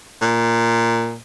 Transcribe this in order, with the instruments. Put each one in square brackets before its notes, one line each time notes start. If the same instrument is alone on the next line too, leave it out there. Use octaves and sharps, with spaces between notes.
[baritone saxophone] A#2